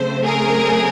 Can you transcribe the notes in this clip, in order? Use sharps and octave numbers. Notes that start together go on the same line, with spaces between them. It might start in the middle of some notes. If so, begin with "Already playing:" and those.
Already playing: C#3 F#3 A3 C4 C5
G#4 A#4